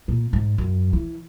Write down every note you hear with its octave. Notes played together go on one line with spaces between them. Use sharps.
A#2
G#2
F#2
E3